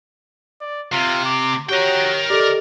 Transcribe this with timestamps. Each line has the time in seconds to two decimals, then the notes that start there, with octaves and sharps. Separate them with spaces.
0.61 D5
0.92 C3 F4
1.25 D6
1.69 F#4 G4 A#4 C#5 G5
2.30 G4 A4 D5 D#5